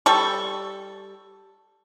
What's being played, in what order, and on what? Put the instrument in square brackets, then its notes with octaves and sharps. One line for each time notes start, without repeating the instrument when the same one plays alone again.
[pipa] G3 A4 C#6